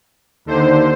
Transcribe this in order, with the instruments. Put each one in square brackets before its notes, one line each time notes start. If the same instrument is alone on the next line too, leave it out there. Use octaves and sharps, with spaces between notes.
[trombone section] D#2 D#4 [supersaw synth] D3 C5